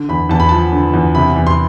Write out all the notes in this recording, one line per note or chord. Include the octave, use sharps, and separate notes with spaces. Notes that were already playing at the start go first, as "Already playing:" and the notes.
Already playing: D3
E2 B5
E2 A5
B5
F3 A5
D3
E2
C3 B5
E2
C6